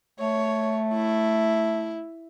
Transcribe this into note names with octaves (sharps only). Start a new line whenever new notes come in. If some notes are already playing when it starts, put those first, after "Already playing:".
A3 C#5
E4